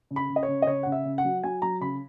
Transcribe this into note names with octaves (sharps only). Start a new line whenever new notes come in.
C#3
B5
C#3
D#5
C#5
C#3
D#5
C#3 C#5
C#3 F#5
E5
C#3
F#5
F#3
F#3 G#5
F#3 A#5
C#3 B5